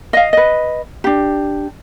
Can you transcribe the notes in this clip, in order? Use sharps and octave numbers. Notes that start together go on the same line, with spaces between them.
D#5 F5
B4 D#5
D4 G4